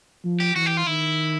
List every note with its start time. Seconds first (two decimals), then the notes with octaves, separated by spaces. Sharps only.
0.25 F3
0.40 G4
0.56 E3 F#4
0.66 G4
0.77 F4
0.87 D#3 E4